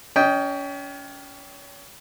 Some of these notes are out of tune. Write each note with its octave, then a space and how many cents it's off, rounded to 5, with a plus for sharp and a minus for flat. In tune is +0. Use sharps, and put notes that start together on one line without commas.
C#4 +30 D#5 +0 G5 +0